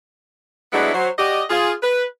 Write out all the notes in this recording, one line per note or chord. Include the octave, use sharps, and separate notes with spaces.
F#3 G#3 A3 B3 D4 E4
F#3 C5
F#4 G4 D5 D#5
F4 G#4
B4